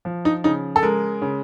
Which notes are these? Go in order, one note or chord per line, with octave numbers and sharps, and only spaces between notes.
F3
D#4
C#3 D#4
A4
G#3 A#4
C#3